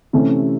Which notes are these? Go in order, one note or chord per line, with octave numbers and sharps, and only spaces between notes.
C3 E3 A3 C#4